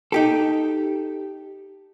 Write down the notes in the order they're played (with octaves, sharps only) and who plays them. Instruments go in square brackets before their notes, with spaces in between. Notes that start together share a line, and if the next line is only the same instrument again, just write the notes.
[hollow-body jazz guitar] D#4 G4 A4